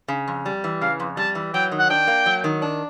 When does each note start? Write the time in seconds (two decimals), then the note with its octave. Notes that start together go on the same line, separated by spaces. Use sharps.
0.08 C#3
0.28 F2
0.46 G3
0.64 E3
0.81 C#3 F5
1.00 F2
1.17 G3 A5
1.35 E3
1.54 F#3 G5
1.71 D#3
1.79 F#5
1.90 D4 G5
2.07 A#3
2.26 F#3
2.44 D#3
2.62 D4